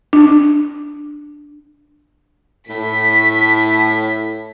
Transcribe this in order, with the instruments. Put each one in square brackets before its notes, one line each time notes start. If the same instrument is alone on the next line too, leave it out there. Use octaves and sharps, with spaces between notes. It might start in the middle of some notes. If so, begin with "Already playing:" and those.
[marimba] D4
[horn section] A2 [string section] B6